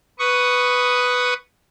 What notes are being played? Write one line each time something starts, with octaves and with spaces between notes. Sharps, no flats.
B4 C#6 D#6